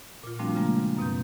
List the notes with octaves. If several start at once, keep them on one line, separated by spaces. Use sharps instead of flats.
A#2 F4
F3 G3 A3 C4 D4 F#4
C#3 F3 G3 G#3 A#3
F#2 B2 C4 G6